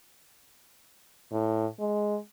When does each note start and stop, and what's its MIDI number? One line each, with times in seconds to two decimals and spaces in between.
1.32 1.66 45
1.80 2.17 56